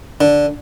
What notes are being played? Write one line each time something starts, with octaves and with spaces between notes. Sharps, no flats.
D3